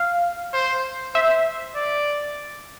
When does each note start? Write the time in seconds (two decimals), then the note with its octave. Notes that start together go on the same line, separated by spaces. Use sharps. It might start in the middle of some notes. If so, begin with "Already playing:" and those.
Already playing: F5
0.53 C5
1.15 C5 E5
1.76 D5